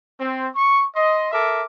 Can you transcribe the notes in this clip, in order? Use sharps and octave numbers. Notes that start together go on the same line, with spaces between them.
C4
C#6
D#5 C6
A4 A#4 E5 D6